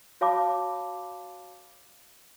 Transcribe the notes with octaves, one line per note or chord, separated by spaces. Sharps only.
F#4 C#5 F5 A5 B5 D6